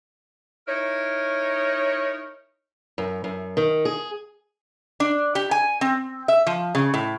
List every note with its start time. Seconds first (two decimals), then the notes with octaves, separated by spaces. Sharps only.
0.67 D#4 E4 A#4 C#5
2.98 F#2
3.24 F#2
3.57 D#3
3.85 G#4
5.00 D4
5.35 G4
5.51 G#5
5.81 C4
6.28 E5
6.47 F3
6.75 C#3
6.94 A2